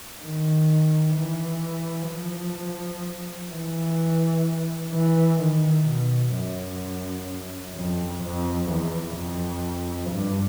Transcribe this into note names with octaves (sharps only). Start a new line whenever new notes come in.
D#3
E3
F3
E3
E3
D#3
B2
F#2
F2
F2
E2
F2
G2